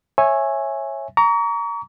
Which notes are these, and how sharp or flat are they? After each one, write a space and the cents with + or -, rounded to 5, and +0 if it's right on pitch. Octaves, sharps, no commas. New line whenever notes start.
C#5 -20 E5 +0 G#5 +0
A#5 +0 C#6 +40